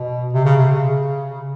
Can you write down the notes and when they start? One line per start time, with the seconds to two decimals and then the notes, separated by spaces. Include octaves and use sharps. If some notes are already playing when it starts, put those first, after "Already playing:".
Already playing: B2
0.33 C3
0.45 C#3
0.57 C3
0.71 C#3